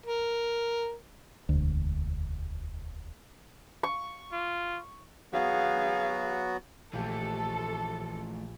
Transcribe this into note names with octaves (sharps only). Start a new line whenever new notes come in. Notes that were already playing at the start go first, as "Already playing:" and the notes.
A#4
E1 D2
C#6
F4
F#3 B3 F#4 G#4 F5
A#1 E3 A3 G4 A4